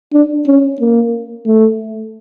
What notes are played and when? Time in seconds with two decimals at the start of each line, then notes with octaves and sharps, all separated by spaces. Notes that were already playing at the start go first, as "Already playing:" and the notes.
0.13 D4
0.47 C#4
0.81 A#3
1.47 A3